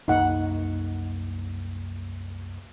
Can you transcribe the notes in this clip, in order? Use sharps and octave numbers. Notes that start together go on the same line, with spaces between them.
C2 F#2 A#3 D#4 F#5